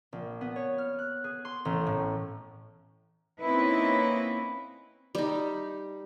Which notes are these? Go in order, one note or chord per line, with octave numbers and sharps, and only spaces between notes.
A#1
B3
C#5
F6
F#6
G#4
C6
A1
A2
A#3 C4 C#4 D#4 E4 B4
G3 D#4